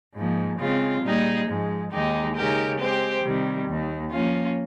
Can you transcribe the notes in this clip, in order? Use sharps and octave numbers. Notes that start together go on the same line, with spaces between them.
G#2 F3 A#3
C#3 G#3 C4 F4
A#2 G3 A#3 D#4 G#4
G#2 F3 G#3
D#2 D#3 G#3 D#4 G4
C#3 G#3 D#4 G4 A#4
G#3 C4 G4 C5
C3 D#3 G3
D#2 D#3 A#3
F3 A#3 C#4 F4